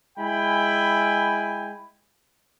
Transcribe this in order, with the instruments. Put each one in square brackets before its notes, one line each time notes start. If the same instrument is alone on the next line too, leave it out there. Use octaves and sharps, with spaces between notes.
[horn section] G#3 E4 G5 G#5 B5